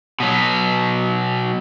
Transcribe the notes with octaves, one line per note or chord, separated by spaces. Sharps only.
B2 F#3